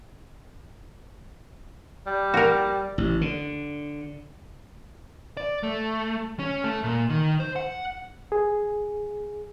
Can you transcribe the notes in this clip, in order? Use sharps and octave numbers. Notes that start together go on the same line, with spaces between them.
G3
F#4 A#4
A1
D3
D5
A3
C#4
A3
A#2
D#3
C5
F#5
G#4